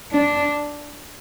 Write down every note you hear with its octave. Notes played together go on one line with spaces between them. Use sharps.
D4